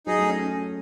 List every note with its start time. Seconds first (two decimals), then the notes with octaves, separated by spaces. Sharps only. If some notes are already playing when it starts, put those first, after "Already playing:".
0.06 F#3 D#4 G#4 D#5
0.18 A3
0.29 C#4